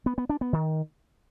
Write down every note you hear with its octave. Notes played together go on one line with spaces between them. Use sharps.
B3
B3
D4
B3
D#3